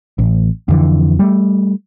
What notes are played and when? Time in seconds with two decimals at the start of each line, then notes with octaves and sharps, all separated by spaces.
0.18 A1
0.68 F2 D3 E3
1.19 G3 A3